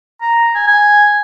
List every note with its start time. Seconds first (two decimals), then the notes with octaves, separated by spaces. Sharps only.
0.22 A#5
0.55 G#5
0.67 G#5